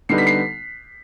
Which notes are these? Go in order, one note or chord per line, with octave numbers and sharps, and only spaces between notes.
D3 G3 B3 D#4 C7
B6
C7